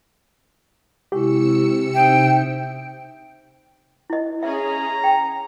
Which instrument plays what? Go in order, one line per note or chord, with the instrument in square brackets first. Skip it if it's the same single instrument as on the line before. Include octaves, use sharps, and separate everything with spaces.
[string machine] C3 E6 C#7 [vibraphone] G#3 E4 C#6 [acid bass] G4
[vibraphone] D#4 C5 E5 [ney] G5
[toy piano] E4 D#5
[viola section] C#4 G#4 [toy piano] E5 [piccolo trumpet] A#5
[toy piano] G5